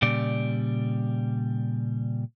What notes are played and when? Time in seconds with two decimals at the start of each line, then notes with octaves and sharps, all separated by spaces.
0.02 A#2 C#3 G3 D5